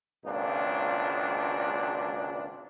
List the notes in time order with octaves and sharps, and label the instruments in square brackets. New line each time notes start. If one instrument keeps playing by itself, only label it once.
[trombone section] G#1 C#2 A#2 D4